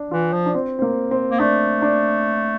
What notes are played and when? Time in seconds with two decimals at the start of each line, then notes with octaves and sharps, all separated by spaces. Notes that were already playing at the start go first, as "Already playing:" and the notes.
Already playing: D4
0.11 E3 F4
0.33 F3
0.46 D4
0.55 C4
0.79 C4
0.82 A#3
1.11 C4
1.31 A#3
1.40 A3 D4
1.82 D4